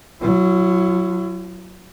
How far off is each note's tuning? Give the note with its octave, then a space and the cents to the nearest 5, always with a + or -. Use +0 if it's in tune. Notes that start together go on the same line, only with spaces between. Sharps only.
F#3 +0 E4 +40